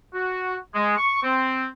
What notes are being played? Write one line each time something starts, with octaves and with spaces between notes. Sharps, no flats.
F#4
G#3
C#6
C4